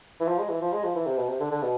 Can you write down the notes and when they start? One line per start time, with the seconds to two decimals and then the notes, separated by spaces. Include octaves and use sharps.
0.20 E3
0.28 F3
0.39 G#3
0.50 E3
0.62 F3
0.73 G#3
0.84 F3
0.95 E3
1.06 C3
1.18 B2
1.29 C3
1.40 D3
1.51 D3
1.63 B2